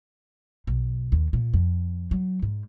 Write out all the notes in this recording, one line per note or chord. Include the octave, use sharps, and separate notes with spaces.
B1
D#2
A#2
F2
F#3
G#2